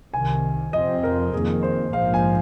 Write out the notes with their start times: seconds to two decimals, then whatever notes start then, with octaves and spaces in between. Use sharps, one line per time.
0.13 C2 C3 D#3 G#5
0.73 F2 C3 F3 C4 D#5
1.03 A#4
1.33 F2 D#3 A#3 G#4
1.63 C5
1.93 A#1 G#2 F3 A#3 F5
2.14 G#5